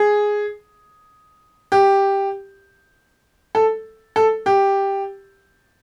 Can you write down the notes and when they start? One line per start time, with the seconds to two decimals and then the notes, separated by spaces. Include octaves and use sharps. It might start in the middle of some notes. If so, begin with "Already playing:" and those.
Already playing: G#4
1.72 G4
3.55 A4
4.16 A4
4.46 G4